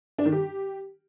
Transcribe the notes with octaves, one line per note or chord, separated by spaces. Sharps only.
D4
D#3
G4